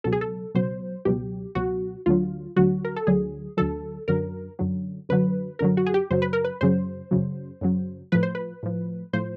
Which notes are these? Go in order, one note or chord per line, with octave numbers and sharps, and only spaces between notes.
C#2 B2 F#3 A4
G#4
A4
C#2 B2 F#3 C5
C#2 B2 F#3 G4
C#2 B2 F#3 F#4
D2 D3 F#3 F4
D2 D3 F#3 F#4
A#4
A4
D2 D3 F#3 G#4
D2 D3 F#3 A4
F#2 D3 F#3 A#4
F#2 D3 F#3
F#2 D3 F#3 B4
F#2 D3 F#3 A#4
F#4
G#4
G4
F#2 C#3 F#3 C5
B4
A#4
B4
F#2 C#3 F#3 C5
F#2 C#3 F#3
F#2 C#3 F#3
A2 F3 B4
C5
B4
A2 F3
A2 F3 C5